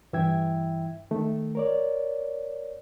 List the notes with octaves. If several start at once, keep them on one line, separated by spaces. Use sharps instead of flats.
G2 E3 E4 E5 G5 G#6
D#3 A3
A#4 C#5 D5